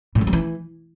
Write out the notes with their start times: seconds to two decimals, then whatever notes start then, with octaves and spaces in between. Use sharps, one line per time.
0.15 A2
0.21 F3
0.27 G3
0.33 E3